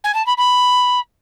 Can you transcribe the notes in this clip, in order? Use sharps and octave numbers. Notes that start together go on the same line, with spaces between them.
G#5
A5
B5
B5